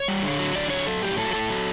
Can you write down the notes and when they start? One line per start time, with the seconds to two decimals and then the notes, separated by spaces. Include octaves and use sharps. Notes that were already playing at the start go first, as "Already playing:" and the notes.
Already playing: C#5
0.08 G3
0.23 D3
0.39 F#3
0.55 D3 D5
0.70 F#3 C#5
0.87 F#3 A4
1.02 A2 G4
1.17 F#3 A4
1.33 A2 A4
1.50 F#3